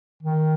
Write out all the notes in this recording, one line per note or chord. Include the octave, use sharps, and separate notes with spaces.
D#3